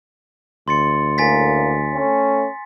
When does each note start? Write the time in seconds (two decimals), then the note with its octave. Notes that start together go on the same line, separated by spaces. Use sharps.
0.68 D2 C6 A6 C#7
1.18 A2 C#3 A#3 G#5 A6 B6
1.93 A3 C#4